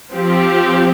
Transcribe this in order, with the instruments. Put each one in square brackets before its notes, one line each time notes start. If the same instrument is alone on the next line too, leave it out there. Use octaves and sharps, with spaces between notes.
[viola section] F3 C4 G4